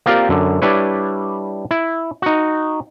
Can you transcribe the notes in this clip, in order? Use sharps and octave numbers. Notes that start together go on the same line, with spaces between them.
A#3 C4 F4 G4 A#4 D5
F#2 D3
G3 D4 E4 B4 C#5
E4
D#4 F#4